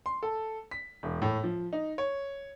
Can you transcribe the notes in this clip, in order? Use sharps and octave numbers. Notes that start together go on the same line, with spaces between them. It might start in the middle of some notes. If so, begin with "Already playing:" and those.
C6
A4
B6
E1
A2
F3
D#4
C#5